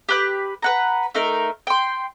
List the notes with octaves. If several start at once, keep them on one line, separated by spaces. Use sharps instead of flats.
G4 B4 F#6
B4 F#5 A#5
A3 D#4 A#4
G5 C6